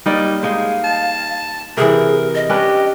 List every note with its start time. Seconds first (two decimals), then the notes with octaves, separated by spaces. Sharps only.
0.06 G3 A#3 D#4 D5
0.43 G#3 D#4 C5 F5
0.84 A5
1.77 C3 E3 G#4 A#4
2.35 D#5
2.49 C#4 D4 G4 B4